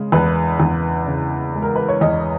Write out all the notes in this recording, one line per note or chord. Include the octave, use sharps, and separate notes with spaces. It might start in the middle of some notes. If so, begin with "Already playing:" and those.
Already playing: C#3 G#3
E2 B4
E2
C#3
G#3
A#4
B4
C#5
E2 D#5